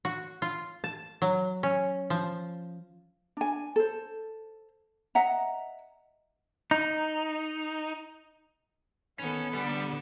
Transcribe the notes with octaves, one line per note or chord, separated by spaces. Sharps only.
F#4
F4
A5
F#3
C#4
F3
D4 G#5
A4 C5
D#5 E5 F#5 A#5
D#4
D#3 B3 C#4 A4
D3 G3 A4